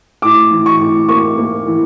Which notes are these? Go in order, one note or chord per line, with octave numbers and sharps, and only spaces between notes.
A2 D6
E3
C#6
A2
A#3 C#6
A#3
E3